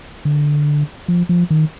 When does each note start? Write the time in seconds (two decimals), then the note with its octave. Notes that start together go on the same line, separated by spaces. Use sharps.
0.25 D3
1.08 F3
1.29 F3
1.50 D#3